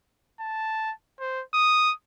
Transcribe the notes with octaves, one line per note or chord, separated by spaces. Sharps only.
A5
C5
D#6